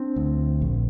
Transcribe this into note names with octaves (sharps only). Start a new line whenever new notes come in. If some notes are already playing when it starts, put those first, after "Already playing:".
Already playing: C4 D4
D2
A#1